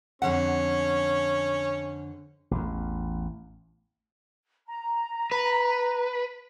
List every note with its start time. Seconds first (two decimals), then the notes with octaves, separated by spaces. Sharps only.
0.22 F2 D3 C#4 F#5
2.51 A1 E2
4.67 A#5
5.31 B4